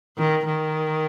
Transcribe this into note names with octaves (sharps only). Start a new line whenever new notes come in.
D#3
D#3